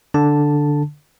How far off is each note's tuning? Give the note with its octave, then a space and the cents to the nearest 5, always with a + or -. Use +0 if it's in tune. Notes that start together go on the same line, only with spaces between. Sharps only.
D3 +0 A5 +0